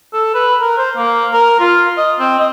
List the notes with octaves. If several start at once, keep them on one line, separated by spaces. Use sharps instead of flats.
A4
B4
A#4
C5
A#3
A#4
F4
D#5
C4
D#5